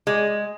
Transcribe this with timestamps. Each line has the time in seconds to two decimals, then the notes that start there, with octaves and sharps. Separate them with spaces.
0.07 G#3